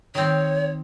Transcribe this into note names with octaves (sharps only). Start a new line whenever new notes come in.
D#3 C4 C#5